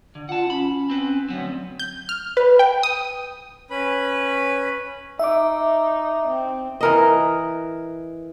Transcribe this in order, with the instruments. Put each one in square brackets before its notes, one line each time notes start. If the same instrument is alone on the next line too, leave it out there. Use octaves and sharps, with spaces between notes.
[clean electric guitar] D3
[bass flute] F4 [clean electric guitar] F#5 A5
[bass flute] C#4 [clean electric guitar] B5
[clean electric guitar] C4 B4
[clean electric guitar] D2 B3 C4 [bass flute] F#3
[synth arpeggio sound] G6
F6
B4
G5
D#6
[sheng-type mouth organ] C#4 B4 B5
[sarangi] D#4 [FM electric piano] E5 D6
[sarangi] C4
[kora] E3 A#4 D#5